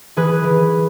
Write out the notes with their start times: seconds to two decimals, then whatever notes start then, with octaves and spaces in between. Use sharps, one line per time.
0.17 E3 G#4 B4
0.44 E3